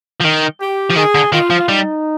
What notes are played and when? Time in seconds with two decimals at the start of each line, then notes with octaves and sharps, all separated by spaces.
0.21 F3
0.25 D#3
0.60 G4
0.90 F3
0.96 D#3 G#4
1.15 D3
1.32 D#3 F4
1.50 F3
1.68 G3 D#4